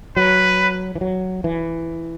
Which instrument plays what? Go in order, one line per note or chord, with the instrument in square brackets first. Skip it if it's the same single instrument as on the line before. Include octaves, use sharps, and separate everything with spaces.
[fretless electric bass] F#3 [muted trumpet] B4
[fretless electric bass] E3
F#3
E3